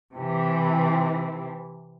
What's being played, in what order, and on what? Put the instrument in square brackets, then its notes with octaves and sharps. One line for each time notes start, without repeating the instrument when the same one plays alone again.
[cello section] C3 E3